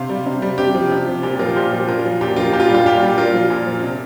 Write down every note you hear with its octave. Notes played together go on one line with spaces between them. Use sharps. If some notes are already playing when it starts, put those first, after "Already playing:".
Already playing: C3 C5 F5
G3
C3
G3
C3 G4
F3
C3
F3
A#2 G4
F3 F4 A#4
A#2 G4 C5
F3
A#2 F4 A#4
F3
A#2 G4
F3 F4 A#4
A#2 G4
F4
G4
G3
F4
A#2 G4
G3
A#2 F4 A#4
F3
A#2
F3
C3